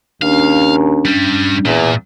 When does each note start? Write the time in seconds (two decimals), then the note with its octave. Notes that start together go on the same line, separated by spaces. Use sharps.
0.22 D#2 C#4 D4 F5
1.05 G2 G3
1.65 E2 A#2